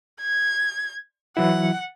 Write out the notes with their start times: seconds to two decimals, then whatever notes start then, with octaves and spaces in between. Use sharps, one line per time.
0.21 G#6
1.37 E3 F#3 E4 F#5